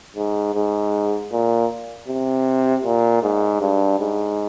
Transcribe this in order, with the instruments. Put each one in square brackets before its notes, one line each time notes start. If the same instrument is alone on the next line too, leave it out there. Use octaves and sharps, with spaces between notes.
[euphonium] G#2
G#2
A#2
C3
A#2
G#2
G2
G#2